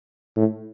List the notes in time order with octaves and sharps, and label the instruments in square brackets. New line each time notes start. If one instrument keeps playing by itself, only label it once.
[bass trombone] A2